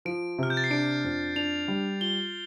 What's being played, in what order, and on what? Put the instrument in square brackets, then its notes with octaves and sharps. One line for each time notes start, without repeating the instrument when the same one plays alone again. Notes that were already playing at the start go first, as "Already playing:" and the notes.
[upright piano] F3 [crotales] D7
[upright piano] C3 [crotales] F6
[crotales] G6
A6
C7
[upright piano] D4 [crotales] D7
[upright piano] F2
[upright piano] D4 [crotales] F7
[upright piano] G3
[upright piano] F4 [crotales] G7